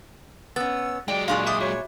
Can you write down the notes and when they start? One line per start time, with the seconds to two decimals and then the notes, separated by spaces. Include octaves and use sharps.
0.56 B3 C#4 E6 A6
1.08 F#3 G#3 D5 G5
1.28 A#2 D4 G#4 D5 F5 C6 C#6
1.46 F#4 E5 D6 D#6
1.61 F#4 C#5